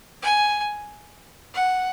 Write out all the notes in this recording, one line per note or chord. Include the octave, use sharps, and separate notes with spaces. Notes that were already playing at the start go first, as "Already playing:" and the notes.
G#5
F#5